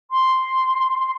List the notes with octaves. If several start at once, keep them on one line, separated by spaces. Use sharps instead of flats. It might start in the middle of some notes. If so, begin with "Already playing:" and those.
C6